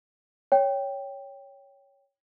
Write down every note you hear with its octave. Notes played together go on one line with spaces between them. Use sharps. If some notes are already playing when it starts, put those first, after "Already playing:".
C#5 G5